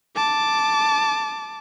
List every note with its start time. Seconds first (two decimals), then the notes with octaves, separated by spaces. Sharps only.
0.16 A5 D6